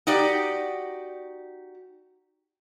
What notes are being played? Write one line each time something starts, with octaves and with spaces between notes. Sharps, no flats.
D#4 F#4 G4 D5